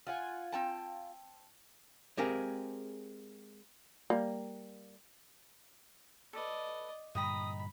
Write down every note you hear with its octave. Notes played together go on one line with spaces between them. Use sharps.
F4 F#5 G#5
C4 G5 A5
G#3 C4 G4 G#4 A#4 F5
G3 A#3
A4 B4 D5 D#5
G2 A#2 D3 D#5 G5 A#5 B5 D#6